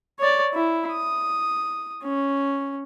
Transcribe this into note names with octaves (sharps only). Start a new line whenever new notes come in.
C#5 D5
E4
D#6
C#4